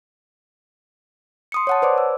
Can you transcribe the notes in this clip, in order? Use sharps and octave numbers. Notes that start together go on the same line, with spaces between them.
C6 D#6 C#7
C#5 F#5 A5
B4 C5 D5 D6
E6